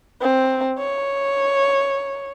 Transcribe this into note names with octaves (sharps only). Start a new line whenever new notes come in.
C4
C#5